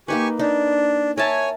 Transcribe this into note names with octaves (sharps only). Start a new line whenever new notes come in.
A#3 D#4 G4 B4 G#5 C#6
D4 D#4
A#4 C#5 E5 G#5 A5